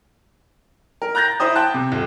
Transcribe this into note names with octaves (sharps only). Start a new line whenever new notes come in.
A#4
A#5 F#6 G6 A6 A#6
E4 C5 D#6
G5 A5 F#6
C3
D#1